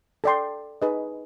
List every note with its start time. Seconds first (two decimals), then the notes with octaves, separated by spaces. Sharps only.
0.24 A4 D5 G5 C6
0.82 D#4 G#4 B4 D#5